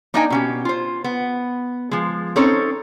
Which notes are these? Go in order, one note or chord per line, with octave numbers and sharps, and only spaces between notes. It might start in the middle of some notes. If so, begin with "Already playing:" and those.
A#3 D4 D#4 D#5 G5 G#5
B2 C#4 G4
F4 C5
B3
F3 G#3
C4 C#4 D#4 A4 C5 C#5